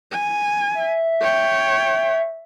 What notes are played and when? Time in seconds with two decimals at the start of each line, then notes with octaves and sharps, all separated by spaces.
0.12 G#5
0.74 E5
1.21 C#5 G5